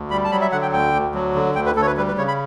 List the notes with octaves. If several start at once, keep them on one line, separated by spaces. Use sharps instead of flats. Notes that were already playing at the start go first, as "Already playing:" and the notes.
Already playing: D2
G3 B5
A5
F#3 B5
E5
D3 F#5
G5
D2 G5
D2
F#3
D3
D2 G5
B4
D2 A4
C#5
B4
G3 B4
B4
C#3 C#5
B5